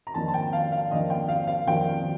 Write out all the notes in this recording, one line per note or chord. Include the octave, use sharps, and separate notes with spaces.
A#5
F2 D#3 A#3 D4 A5
A5
G5
F5
F5
F2 D#3 A#3 D4 D#5
G5
F5
F5
F2 D#3 A#3 D4 G5